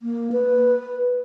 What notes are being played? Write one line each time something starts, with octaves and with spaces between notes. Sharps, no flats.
A#3
B4